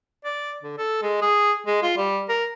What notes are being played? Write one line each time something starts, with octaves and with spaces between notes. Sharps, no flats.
D5
D3
A4
G#3
G#4
G#3
F4
G3
A#4